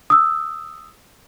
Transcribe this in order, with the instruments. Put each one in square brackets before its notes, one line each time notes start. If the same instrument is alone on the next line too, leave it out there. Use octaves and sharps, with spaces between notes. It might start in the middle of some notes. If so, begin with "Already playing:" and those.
[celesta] D#6 E6